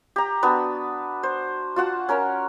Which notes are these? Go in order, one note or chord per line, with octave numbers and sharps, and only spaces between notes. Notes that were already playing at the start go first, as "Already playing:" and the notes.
G4 A#5
B3 D4 F#4 B4
C5
F4 F#4 F#5 A5
C#4 A#4 C#5